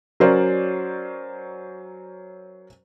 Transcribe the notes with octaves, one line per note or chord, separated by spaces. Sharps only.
F#3 C#4 A#4 C5 D5